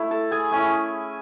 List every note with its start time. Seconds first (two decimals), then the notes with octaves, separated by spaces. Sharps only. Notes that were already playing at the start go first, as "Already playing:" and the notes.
Already playing: A3 E4
0.11 A4 A5
0.31 G#4 G#5
0.51 A3 C#4 E4 G#4 G#5